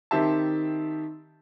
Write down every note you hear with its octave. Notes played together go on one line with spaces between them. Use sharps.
D#3 C4 G4 E5 A5